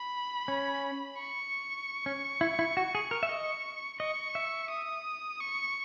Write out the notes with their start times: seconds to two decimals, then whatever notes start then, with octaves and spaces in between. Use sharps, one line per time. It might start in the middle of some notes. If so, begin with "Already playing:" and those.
Already playing: B5
0.48 C#4
1.19 C#6
2.06 C#4
2.41 E4
2.59 E4
2.77 F#4
2.95 G#4
3.11 A#4
3.23 E5
3.29 D#5
3.99 D#5 C#6
4.35 E5
4.70 D#6
5.40 C#6